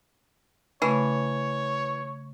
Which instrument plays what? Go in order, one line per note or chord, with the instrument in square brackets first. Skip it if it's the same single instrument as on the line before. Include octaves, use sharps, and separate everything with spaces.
[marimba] C#3 A3 C#4 [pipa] E3 [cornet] C#5